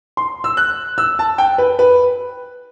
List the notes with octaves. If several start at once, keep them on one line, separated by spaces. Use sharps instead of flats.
C6
E6
F#6
E6
A5
G5
B4
B4